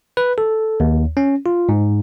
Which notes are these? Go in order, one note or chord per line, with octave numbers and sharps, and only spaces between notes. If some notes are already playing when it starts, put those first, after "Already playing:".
B4
A4
D#2
C#4
F4
G#2